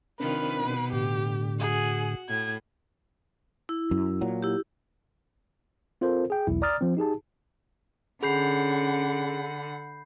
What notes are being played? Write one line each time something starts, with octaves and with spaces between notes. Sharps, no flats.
C3 D#3 F3 C4 D4 A#4 B4
B2
A2 D3 G4
F#4 G#4
A2 G#6
E4
F#2
A#2 F#3
E4 G4
C4 F4 A4 A#4 C5
G#4 G5
B1 E2 E4
D5 A#5 D6 D#6 F6 A6
F3 C4
D#4 G4 G#4 A5
D3 C#4 G#4 F#5 B5 G6 C7